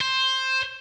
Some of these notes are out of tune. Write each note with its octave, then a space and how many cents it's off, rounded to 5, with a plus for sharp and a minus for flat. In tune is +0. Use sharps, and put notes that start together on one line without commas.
C5 +10